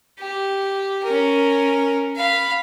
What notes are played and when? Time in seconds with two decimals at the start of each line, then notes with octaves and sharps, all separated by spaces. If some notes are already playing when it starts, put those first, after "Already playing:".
0.19 G4
1.04 C#4 A#4
2.16 F5 B5